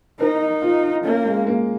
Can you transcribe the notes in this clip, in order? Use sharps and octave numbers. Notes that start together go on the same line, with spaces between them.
D#4 A#4
F4
A#3 C#4
G#3
A#3